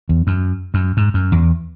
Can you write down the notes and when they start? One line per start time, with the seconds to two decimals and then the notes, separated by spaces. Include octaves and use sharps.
0.09 E2
0.27 F#2
0.74 F#2
0.97 G#2
1.14 F#2
1.32 E2